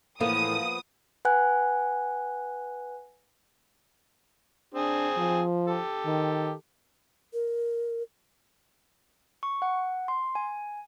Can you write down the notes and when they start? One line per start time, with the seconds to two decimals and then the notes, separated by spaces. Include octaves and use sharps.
0.20 A2 E3 F3 A#3 B3 D#6
1.25 B4 F#5 G#5 F#6
4.74 C4 D4 G#4
5.17 F3
5.67 G4 A4
6.06 D#3
7.33 A#4
9.43 C#6
9.62 F#5
10.08 C6
10.35 G#5